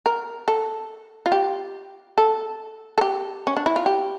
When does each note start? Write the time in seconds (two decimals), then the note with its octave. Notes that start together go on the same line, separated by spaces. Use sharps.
0.06 A#4
0.48 A4
1.26 F4
1.32 G4
2.18 A4
2.98 A4
3.01 G4
3.47 C#4
3.57 D4
3.66 E4
3.76 F4
3.86 G4